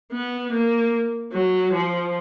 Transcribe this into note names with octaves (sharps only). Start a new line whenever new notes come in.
B3
A#3
F#3
F3